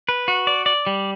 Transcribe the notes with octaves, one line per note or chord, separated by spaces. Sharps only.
B4
F#4
D5
D5
G3